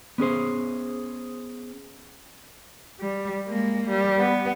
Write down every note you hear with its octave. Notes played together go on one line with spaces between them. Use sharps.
B3 C#4 G#4 C5
G3
G#3 A#3
G3
B3